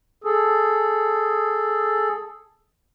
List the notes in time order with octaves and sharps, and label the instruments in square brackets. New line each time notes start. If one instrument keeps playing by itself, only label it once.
[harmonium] G#4 A4